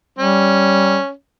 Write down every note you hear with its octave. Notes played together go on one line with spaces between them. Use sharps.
G3 C#4